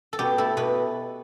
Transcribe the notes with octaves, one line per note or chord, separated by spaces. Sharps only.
A4
B2 G4
A3 E4 A4
B2 B4